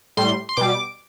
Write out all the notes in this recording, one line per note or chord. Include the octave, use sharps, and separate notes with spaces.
A2 G3 C6
C6
B2 G3 D6